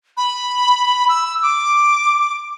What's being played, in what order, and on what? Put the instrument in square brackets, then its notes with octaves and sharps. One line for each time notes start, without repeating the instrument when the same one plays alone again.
[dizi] B5
E6
D6